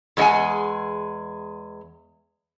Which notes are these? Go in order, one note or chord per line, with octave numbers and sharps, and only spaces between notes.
E2 G#3 A#3 D#4 F#5 G#5